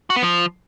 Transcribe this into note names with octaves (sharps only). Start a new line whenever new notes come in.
F#4
B3
F3